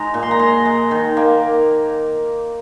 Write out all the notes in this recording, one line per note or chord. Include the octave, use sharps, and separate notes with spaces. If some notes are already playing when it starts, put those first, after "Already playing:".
Already playing: G#3 D#4 A#5
A#2
C6
A#5
G#3 C6
G#3
D#3
A#3